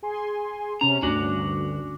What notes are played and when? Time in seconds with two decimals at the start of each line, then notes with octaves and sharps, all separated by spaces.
0.03 G#4 G#5 C6
0.81 C3 C#4 A#5
1.02 D2 G2 C#4 D4 F#4